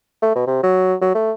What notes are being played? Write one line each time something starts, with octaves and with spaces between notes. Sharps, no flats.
A3
B2
C3
F#3
F#3
A3